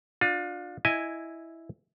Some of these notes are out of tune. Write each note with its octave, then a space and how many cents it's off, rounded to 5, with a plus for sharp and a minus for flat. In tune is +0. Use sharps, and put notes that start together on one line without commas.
D4 +15 F4 +30
E4 +0 D#5 +0 G#5 +0